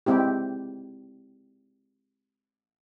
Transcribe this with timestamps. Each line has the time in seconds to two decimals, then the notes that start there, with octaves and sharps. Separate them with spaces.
0.06 G#3 C4 E4 G4